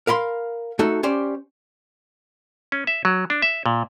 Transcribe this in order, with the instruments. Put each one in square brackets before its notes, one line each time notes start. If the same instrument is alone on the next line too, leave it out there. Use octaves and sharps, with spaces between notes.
[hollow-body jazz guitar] A#4 F5 B5 C6
A3 D#4 F#4 A4
C#4 G4 C5 D5
[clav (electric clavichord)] C#4
E5
F#3
D4
E5
A#2